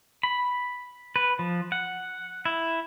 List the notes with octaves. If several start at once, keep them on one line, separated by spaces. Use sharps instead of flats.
B5
B4
F3
F#5
E4